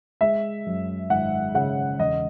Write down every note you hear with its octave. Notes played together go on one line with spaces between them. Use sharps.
G#3 E5
F#2
G#1 F#5
C#3 F#5
E1 D#5